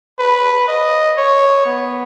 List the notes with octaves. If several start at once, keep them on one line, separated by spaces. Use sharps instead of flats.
B4
D#5
C#5
B3